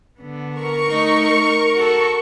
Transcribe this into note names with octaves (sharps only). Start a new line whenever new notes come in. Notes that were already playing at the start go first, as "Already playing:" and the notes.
D3 B3
A#4 C#6
A3 D#4
F#4 A4